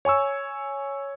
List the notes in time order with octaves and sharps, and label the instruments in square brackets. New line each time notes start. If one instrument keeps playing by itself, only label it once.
[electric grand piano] C#5 G#5 C#6 E6